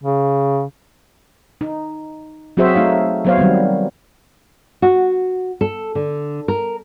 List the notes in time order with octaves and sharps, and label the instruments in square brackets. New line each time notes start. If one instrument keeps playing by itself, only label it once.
[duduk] C#3
[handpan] D#4
F#3 C4 F#4 G#4 C5 E5
A3 D#4 F5
F#3 B3 C5 C#5 F5
D#3 F#3 G3 C4
[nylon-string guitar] F#4
A4
D3
A#4